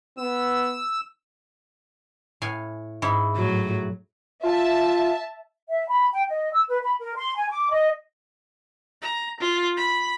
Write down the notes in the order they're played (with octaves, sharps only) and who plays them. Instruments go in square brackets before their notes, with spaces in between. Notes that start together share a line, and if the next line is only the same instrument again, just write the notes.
[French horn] B3 [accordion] E6
[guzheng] A2 F5 G#5
G#2 E4
[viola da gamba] A2 F#3
[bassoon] F4 [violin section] E5 A5
[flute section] E5
B5
G5
D#5
E6
B4
B5
A#4
C6
G#5
D6
D#5
[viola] A#5
F4
B5